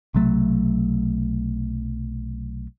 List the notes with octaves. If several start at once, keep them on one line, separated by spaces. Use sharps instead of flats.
B1 C3 F#3 A3